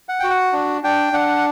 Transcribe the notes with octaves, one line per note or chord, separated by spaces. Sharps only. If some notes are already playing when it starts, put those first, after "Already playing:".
F#5
F#4 G5
F#5
D4
D4 G5
D4 F#5